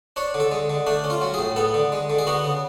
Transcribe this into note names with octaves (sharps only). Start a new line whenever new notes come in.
D4 C#5
D3
A4
G#3
D3
A3 D4
C#4
F4
F#3
A2 G#4
B3 A4
D3
G#3
D3
G#4
B3 F#4
C#3